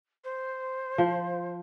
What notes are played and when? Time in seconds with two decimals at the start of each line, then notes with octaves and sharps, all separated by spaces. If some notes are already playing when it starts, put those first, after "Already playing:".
0.24 C5
0.98 F3